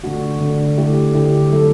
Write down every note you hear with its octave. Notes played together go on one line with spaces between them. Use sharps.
D3 A3 D4 F#4
D3 A3 D4 F#4
D3 A3 E4 G4
D3 A3 E4 G4
F#3 A3 E4 A4